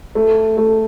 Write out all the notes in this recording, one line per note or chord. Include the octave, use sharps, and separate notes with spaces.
A3
A3